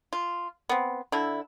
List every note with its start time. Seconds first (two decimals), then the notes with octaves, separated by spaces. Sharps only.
0.13 F4
0.69 B3 C4
1.12 D3 E4